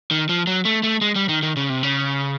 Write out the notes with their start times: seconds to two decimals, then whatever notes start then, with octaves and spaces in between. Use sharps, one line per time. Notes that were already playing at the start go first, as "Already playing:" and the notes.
0.11 D#3
0.29 F3
0.47 F#3
0.65 A3
0.83 A3
1.01 G#3
1.15 G3
1.29 D#3
1.43 D#3
1.57 C#3
1.70 C3
1.83 C#3